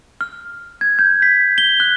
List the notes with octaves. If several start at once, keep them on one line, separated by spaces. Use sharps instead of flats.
F6
G#6
G6
B6
G7
F#6